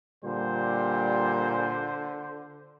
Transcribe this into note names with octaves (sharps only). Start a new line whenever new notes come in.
A#2 D3 G3 C5